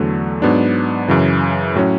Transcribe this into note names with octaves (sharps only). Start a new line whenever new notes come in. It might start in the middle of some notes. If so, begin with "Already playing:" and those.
Already playing: E2 D3 F#3 A3
G#2 F#3 B3 D4
F#2 C#3 E3
A2 F#3 C#4